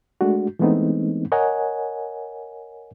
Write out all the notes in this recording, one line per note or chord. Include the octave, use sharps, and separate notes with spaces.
G#3 A3 D4 F#4
E3 G#3 A3 B3 C4 D#4
A#4 C#5 D#5 F#5 G#5